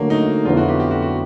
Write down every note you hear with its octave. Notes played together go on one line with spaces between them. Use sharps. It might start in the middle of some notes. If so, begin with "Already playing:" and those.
Already playing: D3 F#3 A3 A#3
D#4
F2 D3 F#3 B3 E4 F4
F#4
G4
G4
F#4
F#4